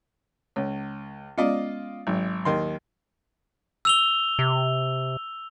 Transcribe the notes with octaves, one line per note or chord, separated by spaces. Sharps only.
C#2 C#5
G#3 B3 C#4 F4 D5 D#5
G#1 F#3
D#2 D#3 C6
E6 F7 G7
C3